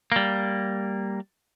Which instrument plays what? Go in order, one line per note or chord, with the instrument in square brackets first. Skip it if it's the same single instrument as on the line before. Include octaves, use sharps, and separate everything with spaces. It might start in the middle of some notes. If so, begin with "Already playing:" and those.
[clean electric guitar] G3 A#3